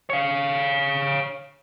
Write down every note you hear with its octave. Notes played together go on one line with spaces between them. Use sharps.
C#5 F5